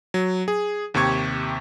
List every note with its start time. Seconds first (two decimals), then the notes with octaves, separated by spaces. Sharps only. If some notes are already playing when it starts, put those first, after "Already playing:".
0.14 F#3
0.48 G#4
0.94 D#2 C3 G4 C#6 G#6